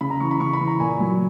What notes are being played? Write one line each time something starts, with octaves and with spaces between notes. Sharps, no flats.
C#3 B5
A#5
E3 C#6
B5
C#3 C#6
B5
E3
A#5
A#2 G#5
F#3